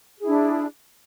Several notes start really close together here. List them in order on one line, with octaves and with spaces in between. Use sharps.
G#4 E4 D4